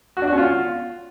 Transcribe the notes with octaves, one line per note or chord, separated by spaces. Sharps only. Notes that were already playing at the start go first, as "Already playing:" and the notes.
F#4
D4
F#4
C#4
F4